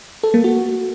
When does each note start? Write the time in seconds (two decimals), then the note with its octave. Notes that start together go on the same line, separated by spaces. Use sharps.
0.23 A4
0.34 A#3
0.44 F#4